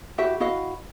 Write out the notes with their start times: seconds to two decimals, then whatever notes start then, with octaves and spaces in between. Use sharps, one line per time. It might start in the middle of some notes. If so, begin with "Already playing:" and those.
0.18 E4 F#4 G4 E5
0.40 E4 F#4 D#5 F5